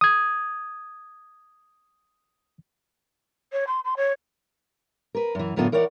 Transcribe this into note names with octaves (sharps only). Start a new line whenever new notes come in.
D#6 G#6
C#5
C6
C6
C#5
A#4 B4
F#2 E3
F#2 A2 D3 F#3 B3 F4
E3 A#4 C#5 D5 F#5